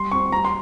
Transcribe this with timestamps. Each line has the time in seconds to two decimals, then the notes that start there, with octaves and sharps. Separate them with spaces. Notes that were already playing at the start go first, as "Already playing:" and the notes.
Already playing: G3 C6
0.12 C4 C#6
0.32 G3 A#5
0.45 C6